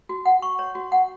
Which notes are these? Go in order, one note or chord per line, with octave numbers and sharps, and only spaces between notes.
F#4
F#5
C#6
C#5
F#4
F#5